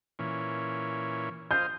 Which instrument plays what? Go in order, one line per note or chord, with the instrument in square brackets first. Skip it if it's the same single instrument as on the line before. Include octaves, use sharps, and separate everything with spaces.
[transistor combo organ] A#2 E3 C#4
[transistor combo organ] F4 C5 D#5 [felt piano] G6